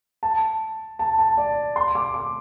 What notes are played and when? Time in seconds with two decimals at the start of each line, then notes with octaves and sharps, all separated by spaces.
0.23 A5
0.99 A5
1.19 A5
1.38 D5
1.76 C6
1.95 D6
2.14 D6